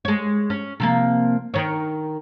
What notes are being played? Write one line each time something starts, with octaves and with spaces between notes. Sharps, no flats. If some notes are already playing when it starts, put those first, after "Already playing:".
G#3 C#5
C#4
C3 F3 A#3
D#3 C#5